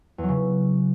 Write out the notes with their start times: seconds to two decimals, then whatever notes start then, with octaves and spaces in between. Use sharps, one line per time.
0.18 E2
0.23 F#3
0.28 C#3